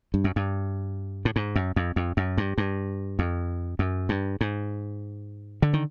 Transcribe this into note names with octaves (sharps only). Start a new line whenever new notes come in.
G2
F#2
G2
A2
G#2
F#2
F2
F2
F#2
G2
G2
F2
F#2
G2
G#2
D3
D#3